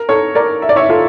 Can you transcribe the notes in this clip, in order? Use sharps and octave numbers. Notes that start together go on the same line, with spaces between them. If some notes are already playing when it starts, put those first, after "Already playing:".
Already playing: A#4
A4 C#5
A#4 D5
E5
D5
C#5 E5
F4 A4